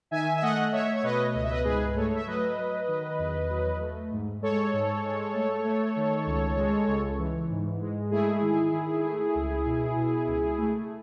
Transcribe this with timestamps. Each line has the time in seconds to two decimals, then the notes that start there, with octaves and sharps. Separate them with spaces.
0.11 D#3 E5 G#5
0.37 E5
0.42 A3 D#5 F#5
0.72 A3 C#5 E5
0.94 C#5
1.03 B2 B4 D#5
1.34 C#2 D#5
1.43 E5
1.51 B4 D#5
1.64 G#2 G#4 B4
1.96 A3 A4 C#5
2.15 E5
2.27 F#3 B4 D#5
2.57 F#3
2.88 D#3
3.19 E2
3.49 F#3
3.80 A3
4.11 G#2
4.41 G#3 A4 C#5
4.73 G#2
5.03 G#3
5.34 A3
5.64 A3
5.96 D#3
6.27 C#2
6.57 G#3
6.88 C#2
7.19 E3
7.50 G#2
7.80 G#3
8.11 A3 E4 G#4
8.41 D#3
8.72 D#3
9.04 A3
9.35 C#2
9.65 B2
9.96 B2
10.27 C#2
10.58 A3